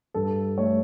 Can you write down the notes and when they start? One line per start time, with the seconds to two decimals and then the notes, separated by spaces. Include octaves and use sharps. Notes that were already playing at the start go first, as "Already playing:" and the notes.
0.14 G2 A4
0.58 A3 C#5